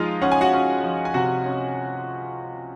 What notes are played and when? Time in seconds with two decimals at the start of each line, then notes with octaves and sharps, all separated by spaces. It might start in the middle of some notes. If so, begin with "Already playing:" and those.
Already playing: F3 G#3 D#4 F4 D#5 F5
0.22 C#4 F#5
0.32 G#5
0.41 F#4 F#5
0.53 C#4
0.84 F3
1.05 G#5
1.14 C3 F#4 F#5
1.46 C#4